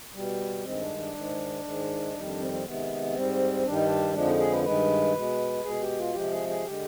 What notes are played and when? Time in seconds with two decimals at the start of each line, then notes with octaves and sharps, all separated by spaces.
0.15 B2 G3
0.64 G2 D#3 G#3 C4
0.81 D4
0.97 D4
1.15 G#2 D#3 G#3
1.64 G#2 D#3 G#3
2.14 F2 D#3 G3 D#4
2.27 D4
2.40 C4
2.51 C4
2.64 C3 D#3 G#3 B3
3.14 G#2 G3 C4
3.64 G2 D#3 G3 D4
3.75 D#4
3.84 D4
4.14 F2 D3 F3 G#3 D4
4.26 D#4
4.39 G#4
4.51 B4
4.64 G2 D#3 G#3 B4
5.15 B2 G#3
5.64 B2 G#3 G#4
5.82 G4
5.98 F4
6.14 C3 F3 G#3 G4
6.31 G#4
6.48 G#4
6.65 D3 G#3 G4